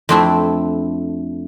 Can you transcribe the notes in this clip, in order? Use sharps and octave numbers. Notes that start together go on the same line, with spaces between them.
F2 A3 C4 D4 E4 A5